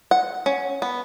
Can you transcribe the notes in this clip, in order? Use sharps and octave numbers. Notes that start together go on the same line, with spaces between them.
F#5
C#4
B3